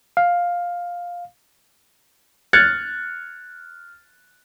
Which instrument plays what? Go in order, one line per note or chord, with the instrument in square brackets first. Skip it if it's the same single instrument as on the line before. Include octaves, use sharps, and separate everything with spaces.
[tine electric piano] F5
[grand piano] F6 F#6 G#6 A6 C#7